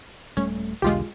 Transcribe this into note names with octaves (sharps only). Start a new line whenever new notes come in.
D#1 G3 A3 C#4
B1 E2 D3 G#3 F4 G4